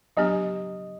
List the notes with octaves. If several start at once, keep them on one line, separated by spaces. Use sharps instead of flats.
F#3 B3 D4 G4 D#5